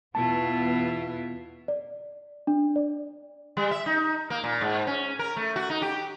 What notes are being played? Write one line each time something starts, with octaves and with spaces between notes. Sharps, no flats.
E2 B2 B3 E4 F4 A5
D5
D4
D5
G3
E5
D#4
A#3
A#2
G#2
C#4
A#4
A3
F#4
D#4
G4